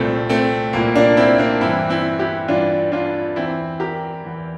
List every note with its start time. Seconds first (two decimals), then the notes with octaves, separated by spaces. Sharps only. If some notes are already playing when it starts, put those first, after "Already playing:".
Already playing: C2 A#2 A3 C4
0.29 A3 C4
0.73 C2 A#2 A#3
0.95 A#3 D4
1.17 C4 E4
1.38 A#3 D4
1.61 G2 E3 C4 E4
1.90 C4 E4
2.19 E4 G4
2.48 G2 E3 D4 F4
2.92 D4 F4
3.36 E2 E3 C4 E4
3.80 G4 A#4
4.24 E2 E3